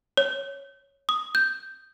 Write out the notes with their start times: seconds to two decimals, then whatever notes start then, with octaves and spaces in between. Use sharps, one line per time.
0.17 C#5
1.09 D#6
1.35 G6